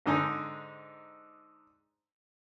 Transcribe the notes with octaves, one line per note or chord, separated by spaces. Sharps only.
G#2 D3 D#4 G#5